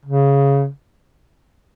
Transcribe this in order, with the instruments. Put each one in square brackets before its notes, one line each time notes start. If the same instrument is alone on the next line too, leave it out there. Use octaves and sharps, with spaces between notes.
[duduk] C#3